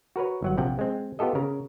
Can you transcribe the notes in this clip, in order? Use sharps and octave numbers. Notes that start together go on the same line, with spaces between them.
F#4 A#4 B4 C#5
G1 F#3 F#5
A#1 C3 F3 F#5 G5
G#3 C4
B3 F4 G4 A4 D#5
C#3 A#4